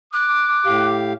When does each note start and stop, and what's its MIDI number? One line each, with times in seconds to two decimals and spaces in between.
0.14 0.98 86
0.14 0.86 90
0.66 1.13 45
0.66 1.13 67
0.66 1.13 77